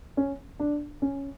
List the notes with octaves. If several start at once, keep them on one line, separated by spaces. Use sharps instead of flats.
C#4
D4
C#4